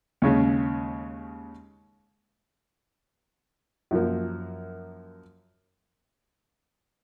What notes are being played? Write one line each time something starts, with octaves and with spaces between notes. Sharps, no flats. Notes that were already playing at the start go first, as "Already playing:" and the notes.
D#2 C#3 G#3 C#4
F#2 F3 A#3